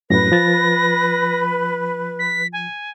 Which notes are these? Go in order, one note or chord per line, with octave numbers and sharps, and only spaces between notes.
F#2 A2 B4 A#6
F3 A6
B6
G#5